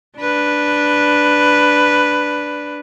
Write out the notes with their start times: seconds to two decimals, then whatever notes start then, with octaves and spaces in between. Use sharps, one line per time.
0.18 D4 B4